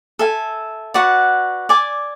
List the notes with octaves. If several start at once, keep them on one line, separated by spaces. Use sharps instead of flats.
A4 E5 G#5
F#4 B4 D5 F#5
D5 G#5 D6